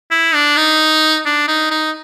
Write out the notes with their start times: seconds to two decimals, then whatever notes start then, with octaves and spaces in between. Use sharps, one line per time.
0.11 E4
0.34 D4
0.57 D#4
1.26 D4
1.48 D#4
1.70 D#4